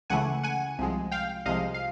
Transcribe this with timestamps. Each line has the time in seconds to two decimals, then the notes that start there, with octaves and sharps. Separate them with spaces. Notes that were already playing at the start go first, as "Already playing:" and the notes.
0.10 C#2 C#3 E3 A3 F#5 G#5
0.43 F#5 G#5
0.78 C2 C3 F3 G#3
1.12 F5 G5
1.46 C2 C3 F3 G#3 D#5 F5
1.74 F5